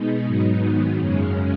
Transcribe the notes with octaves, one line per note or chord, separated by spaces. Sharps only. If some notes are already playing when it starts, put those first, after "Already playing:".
Already playing: B2 G#3 B3 D#4
G#2 F#3 B3 D#4
G#2 D#3 F#3 B3 D#4
F#2 C#3 G#3 C#4